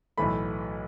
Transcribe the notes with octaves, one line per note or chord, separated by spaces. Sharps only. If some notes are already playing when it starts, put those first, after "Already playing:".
B1 A2 E3 A3 B5